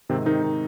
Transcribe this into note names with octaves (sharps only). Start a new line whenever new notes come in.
G#2 C3 D#3 C4
D#3 D#4
D#3